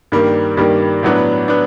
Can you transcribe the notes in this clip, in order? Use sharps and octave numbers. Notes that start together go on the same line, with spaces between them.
G2 D#3 G3 A#3
G2 D#3 G3 A#3
A2 F#3 B3 D4
B3 D4